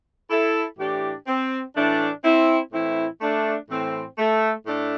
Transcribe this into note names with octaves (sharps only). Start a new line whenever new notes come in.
E4 A4
A2 E3 D4 G4
C4
A2 E3 A3 D4
C4 E4
A2 E3 C4 E4
A3 D4
A2 E3 C4
A3
A2 A3 D4